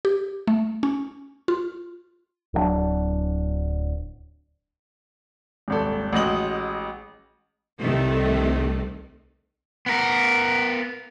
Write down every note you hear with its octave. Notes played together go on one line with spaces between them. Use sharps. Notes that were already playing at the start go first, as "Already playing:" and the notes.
G4
A3
C#4
F4
D1 G2 F#3 D4
D#1 G#1 A4
A1 G#3 F#4 D#5 F#7
C2 C3 D#3 A3
B3 A#4